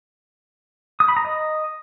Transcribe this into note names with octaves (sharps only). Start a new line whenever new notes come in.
D#6
B5
A#5
D#5